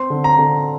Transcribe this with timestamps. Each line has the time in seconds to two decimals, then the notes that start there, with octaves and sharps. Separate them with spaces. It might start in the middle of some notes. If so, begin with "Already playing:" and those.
Already playing: C4 C6
0.10 D3
0.24 A#5
0.39 D3